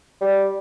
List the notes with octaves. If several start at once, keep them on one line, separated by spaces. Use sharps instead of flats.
G3